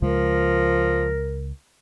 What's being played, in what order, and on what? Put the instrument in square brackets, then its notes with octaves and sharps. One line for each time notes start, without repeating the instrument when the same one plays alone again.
[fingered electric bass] C#2 C#3 G#3 [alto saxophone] F3 [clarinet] A#4